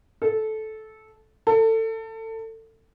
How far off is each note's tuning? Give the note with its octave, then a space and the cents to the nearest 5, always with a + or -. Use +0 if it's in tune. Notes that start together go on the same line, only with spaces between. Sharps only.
A4 -15
A4 +25